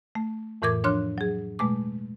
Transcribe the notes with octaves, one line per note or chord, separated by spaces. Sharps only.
A3
F2 A2 E3 A#4 D6 G#6
F3 D4 C#5 C6 F6 F#6
F#3 G#4
B2 G#3 A3 D6